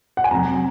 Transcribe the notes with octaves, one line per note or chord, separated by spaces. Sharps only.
F#5
G#5
F2 C3 F#3 A#5